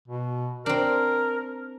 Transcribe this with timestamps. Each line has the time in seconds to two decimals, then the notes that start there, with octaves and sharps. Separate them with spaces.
0.08 B2
0.66 C4 D4 A#4